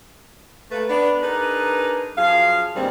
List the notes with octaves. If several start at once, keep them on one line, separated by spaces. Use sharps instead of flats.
A3 A#3 B4
B3 D4
D4 D#4 G#4 A#4 B4
F#2 F3 G#4 F5
G2 A#2 D#3 G3 G#3 C4